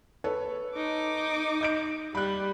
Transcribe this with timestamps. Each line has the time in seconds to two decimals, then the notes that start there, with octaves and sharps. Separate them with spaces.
0.24 A4 B4 C#5
0.75 D#4 D6
1.61 D#5 G6 D7
2.15 G3 B5 F#6